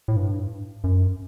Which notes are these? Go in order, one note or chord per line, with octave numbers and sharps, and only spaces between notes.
A2
G2
F#2